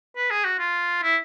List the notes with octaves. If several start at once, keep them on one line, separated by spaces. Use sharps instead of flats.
B4
G#4
F#4
F4
E4